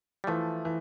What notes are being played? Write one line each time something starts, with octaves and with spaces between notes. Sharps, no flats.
G3
E3 F3 A3
E3